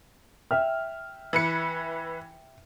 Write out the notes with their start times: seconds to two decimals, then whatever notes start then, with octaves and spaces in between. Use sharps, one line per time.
0.51 E5 G5 F6
1.33 E3 B4 C#7